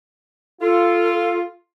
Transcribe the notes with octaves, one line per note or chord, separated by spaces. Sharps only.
F4 A4